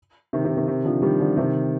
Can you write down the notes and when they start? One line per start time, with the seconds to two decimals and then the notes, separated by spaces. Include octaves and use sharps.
0.33 C3 D#3
0.44 C3 D#3
0.56 C3 D#3
0.67 C3 D#3
0.85 D3 F3
1.02 D#3 G3
1.20 D3 F3
1.37 C3 D#3